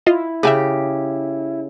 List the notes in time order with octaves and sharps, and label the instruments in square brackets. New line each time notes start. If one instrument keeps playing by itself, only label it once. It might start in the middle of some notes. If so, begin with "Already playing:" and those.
[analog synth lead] E4 [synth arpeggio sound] F4 D#5 F5
[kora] C#3 G4 [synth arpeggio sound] E5 G#5 D6